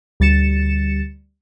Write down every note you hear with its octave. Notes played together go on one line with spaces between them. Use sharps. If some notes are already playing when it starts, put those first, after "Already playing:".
D2 G3 A6 C#7 E7